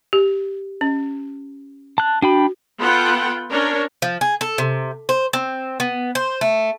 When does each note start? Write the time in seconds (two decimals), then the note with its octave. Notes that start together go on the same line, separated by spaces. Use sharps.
0.13 G4
0.81 C#4
1.98 A5 F#6
2.22 D4 F#4 G5 B5
2.80 B3 F4 A4 F#5 G5
3.50 C#4 D4 A#4 C#5
4.02 F3
4.21 G#4
4.41 A4
4.58 C3
5.09 C5
5.33 C4
5.80 B3
6.15 C5
6.41 A3